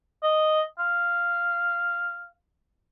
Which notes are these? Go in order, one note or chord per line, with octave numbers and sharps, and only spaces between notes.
D#5
F5